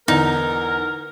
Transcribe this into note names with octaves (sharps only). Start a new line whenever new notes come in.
E2 D3 D#4 A#4